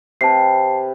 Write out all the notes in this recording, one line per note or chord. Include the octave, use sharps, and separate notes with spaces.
C3 B4 A5 C7